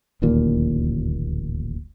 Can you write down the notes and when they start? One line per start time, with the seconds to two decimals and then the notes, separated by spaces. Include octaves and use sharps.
0.22 D1 A1 D#2 A#2